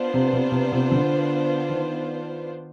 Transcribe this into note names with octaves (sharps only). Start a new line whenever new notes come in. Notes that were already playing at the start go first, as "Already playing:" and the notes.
Already playing: B3 D4 F4 C5
C3
C3
C3
C3
D3
D#3